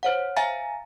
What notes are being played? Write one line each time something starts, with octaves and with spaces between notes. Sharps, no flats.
C5 C#5 F#5
E5 F5 G#5 A#5 A6